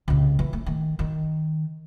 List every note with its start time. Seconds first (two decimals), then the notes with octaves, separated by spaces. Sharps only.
0.08 C#2 C3
0.39 E3
0.53 A3
0.66 D#3
0.99 D#3